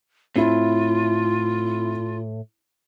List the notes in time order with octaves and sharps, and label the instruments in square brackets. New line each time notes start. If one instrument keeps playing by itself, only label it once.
[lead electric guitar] A2 [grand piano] C4 E4 [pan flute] F4